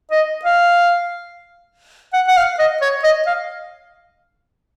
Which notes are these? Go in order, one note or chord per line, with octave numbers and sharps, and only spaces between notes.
D#5
F5
F#5
F#5
F5
D#5
C#5
D#5
F5